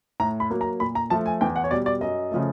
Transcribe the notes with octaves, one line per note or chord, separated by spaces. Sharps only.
A2 A#5
B5
F#3 A#3
A#5
A#2 B5
A#5
F3 A3 A5
G#5
E2 G5
F#5
C#5
B2 G3 D5
D5
F#2 D#5
C#3 F3 A3